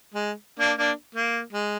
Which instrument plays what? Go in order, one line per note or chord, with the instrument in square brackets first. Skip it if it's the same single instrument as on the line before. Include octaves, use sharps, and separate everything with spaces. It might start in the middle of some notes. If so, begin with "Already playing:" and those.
[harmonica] G#3
A#3 D4
A#3 D4
A#3
G#3